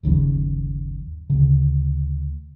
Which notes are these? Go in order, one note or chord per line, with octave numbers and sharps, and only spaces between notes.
G1 D#2 C#3 F3
D2 C#3